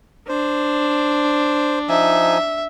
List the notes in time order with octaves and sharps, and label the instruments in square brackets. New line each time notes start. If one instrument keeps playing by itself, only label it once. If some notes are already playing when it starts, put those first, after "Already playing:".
[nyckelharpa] D4 [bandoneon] C5
[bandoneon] F3 D#4 G#5 [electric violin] E5